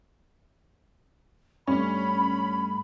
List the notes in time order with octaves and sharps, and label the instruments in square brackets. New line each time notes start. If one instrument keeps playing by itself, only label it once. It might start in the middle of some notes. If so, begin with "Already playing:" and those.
[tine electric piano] G2 G3 A3 [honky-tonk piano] C#4 [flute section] B5